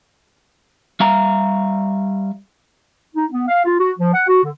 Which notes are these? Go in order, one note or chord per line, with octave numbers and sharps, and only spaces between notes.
G3 E5 F5 A#5
D#4
B3
F5
F4
F#4
F3
F#5
F#4
D3